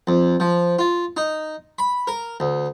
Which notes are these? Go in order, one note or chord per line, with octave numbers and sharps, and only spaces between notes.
F2
F3
F4
D#4
B5
A#4
D2